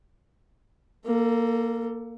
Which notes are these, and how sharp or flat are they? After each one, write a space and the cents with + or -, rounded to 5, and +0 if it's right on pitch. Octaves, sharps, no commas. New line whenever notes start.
A#3 +0 A4 +30